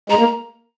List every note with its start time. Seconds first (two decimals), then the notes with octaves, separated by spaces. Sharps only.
0.10 G#3 A#5
0.19 A#3